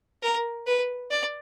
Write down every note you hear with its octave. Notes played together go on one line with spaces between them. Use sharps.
A#4
B4
D5